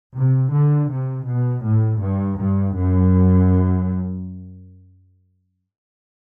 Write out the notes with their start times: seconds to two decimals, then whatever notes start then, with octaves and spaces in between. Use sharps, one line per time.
0.15 C3
0.51 D3
0.89 C3
1.25 B2
1.63 A2
2.00 G2
2.37 G2
2.75 F#2